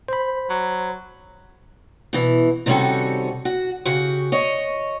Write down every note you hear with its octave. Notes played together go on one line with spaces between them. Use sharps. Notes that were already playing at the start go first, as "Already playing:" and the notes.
C5 B5
F#3
B2 E3
C3 D#3 G3 C#4 F#4 A4
F#4
C#3 F#4 G4
C#5 D#5